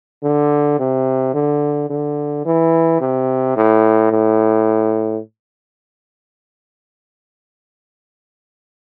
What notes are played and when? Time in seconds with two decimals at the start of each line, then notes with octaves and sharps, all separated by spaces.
0.23 D3
0.79 C3
1.34 D3
1.90 D3
2.45 E3
3.01 C3
3.56 A2
4.11 A2